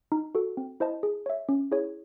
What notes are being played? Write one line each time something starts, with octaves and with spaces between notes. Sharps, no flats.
D#4
F#4 A4
C4
E4 C5 D#5 A5
G#4
C#5 E5
C#4
E4 G#4 C#5